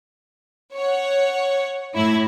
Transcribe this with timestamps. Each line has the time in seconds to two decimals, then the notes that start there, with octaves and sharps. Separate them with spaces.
0.75 C#5 F#5
1.95 A2 E4 G#6